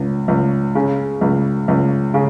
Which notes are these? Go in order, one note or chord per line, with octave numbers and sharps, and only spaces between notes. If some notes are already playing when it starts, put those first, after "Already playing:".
Already playing: C#2
C#2
C#3
C#2
C#2
C#3